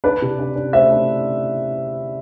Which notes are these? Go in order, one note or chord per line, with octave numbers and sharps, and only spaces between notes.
D4 B4 D5
C3
D4
D4
A3 C5 E5
D4